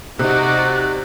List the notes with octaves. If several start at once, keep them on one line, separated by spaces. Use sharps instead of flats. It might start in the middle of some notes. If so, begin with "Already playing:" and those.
C3 D#4 F#4 D5 F#6